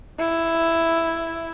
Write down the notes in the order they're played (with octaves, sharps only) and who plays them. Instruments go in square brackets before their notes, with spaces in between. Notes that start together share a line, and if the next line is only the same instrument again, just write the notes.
[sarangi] E4